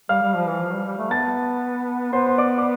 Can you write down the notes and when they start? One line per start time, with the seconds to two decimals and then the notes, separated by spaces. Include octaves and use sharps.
0.09 G3 F5 F6
0.22 G3
0.35 F3
0.47 E3
0.60 F3
0.73 G3
0.85 G3
0.98 A3
1.11 B3 A5 A6
2.13 B3 C5 C6
2.27 C6
2.38 D5 D6
2.58 D6